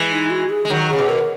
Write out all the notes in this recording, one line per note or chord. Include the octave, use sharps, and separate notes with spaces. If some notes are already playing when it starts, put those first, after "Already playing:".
Already playing: E3 G#3
D#4
F#4
G#4
G#3
D#3 F#3
C#3 G#4
B2
A#4